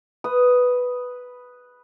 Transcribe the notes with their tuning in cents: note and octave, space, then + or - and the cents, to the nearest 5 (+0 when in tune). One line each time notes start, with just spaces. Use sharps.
B4 +0 D#6 +0